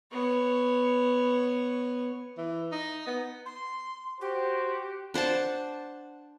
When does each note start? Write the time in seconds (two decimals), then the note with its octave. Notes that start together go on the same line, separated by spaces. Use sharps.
0.11 B3 C#5
2.38 E3
2.72 D#4
3.07 B3
3.45 C6
4.20 F#4 G4 C5
5.14 D4 C5 F#5 A5